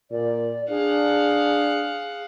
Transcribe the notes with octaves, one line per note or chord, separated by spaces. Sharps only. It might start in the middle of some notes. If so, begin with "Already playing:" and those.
A#2 D5
D4 G#4 F5 F#5